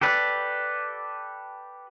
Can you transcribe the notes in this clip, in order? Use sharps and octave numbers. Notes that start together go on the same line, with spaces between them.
G4 A4 B4 D5